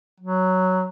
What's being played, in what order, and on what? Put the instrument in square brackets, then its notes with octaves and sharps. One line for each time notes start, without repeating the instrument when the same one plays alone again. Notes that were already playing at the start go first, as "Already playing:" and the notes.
[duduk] F#3